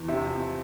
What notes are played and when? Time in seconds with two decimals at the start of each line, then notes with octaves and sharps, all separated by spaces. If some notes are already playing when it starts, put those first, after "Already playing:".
Already playing: E2
0.08 C3 E5
0.24 F3